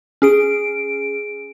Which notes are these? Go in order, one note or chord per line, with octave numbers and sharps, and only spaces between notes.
C#4 G#4 D7